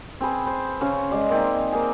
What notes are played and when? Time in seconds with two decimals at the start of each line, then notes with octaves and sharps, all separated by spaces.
0.20 C4 G#4 B4
0.47 C5
0.81 C#3 C#4 C5 C#5
1.11 G#3 G#4 D5
1.30 A#3 C4 D#4
1.72 A#3 G#4